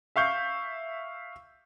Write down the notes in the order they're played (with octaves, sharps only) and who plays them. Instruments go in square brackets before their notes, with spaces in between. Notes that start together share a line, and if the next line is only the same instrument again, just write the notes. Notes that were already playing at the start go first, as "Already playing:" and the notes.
[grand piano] E5 F5 C#6 G6